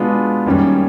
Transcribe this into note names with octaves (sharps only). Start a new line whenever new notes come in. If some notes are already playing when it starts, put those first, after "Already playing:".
Already playing: B2 G#3 B3 D4 F4
F#2 D#3 G3 A#3 C#4